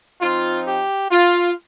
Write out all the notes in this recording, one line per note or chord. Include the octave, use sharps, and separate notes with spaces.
F3 C4 D#4 F4
G4
F4